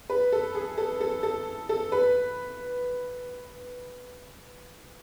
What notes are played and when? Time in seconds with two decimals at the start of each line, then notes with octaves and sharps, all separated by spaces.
0.10 B4
0.32 A4
0.55 G#4
0.78 A4
1.01 A4
1.23 A4
1.69 A4
1.92 B4